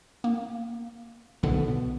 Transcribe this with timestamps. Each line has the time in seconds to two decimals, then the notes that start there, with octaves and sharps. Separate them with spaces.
0.24 A#3
1.43 B1 B2 D3 B3